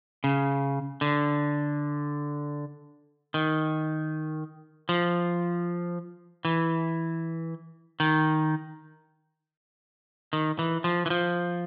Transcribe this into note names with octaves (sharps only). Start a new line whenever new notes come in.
C#3
D3
D#3
F3
E3
D#3
D#3
E3
F3
E3
F3